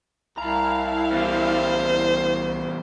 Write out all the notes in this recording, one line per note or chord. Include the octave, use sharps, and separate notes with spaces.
C2 E4 F5 A5 A#5
E2 G3 C5